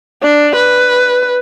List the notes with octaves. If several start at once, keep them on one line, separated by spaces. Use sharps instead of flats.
D4
B4